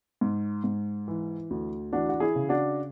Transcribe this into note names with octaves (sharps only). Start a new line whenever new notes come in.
G#2
G#2
E3
D2
E3 D4 F#4
F#4
E4 G#4
C#3
D4 F#4